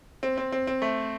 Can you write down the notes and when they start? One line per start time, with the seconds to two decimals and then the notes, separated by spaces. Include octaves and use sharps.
0.23 C4
0.38 C4
0.52 C4
0.67 C4
0.82 A3